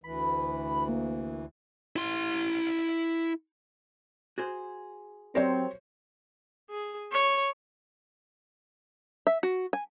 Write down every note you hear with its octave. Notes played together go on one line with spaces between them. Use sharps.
D2 E3 B5
A#3
E4 C6
F#4 G#4 C5
F#3 C4 G4 A#4 C5 C#5
G#4
C#5
E5
F#4
G#5